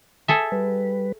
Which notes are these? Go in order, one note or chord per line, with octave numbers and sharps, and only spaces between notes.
G#4 A4 E5
G3 B4